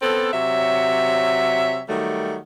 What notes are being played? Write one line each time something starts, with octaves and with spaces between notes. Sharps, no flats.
B3 C4 A4
C3 F#3 C#5 E5
D#3 F#3 G3 A3